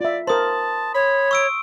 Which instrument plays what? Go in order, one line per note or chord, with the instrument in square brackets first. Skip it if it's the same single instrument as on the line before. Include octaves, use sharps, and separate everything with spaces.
[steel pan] F4 E5 [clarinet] D5
[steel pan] A#4 C5 [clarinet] A5 [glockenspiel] C6 D#6
[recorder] C#5 [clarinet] B5
[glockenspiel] C#6 E6 D7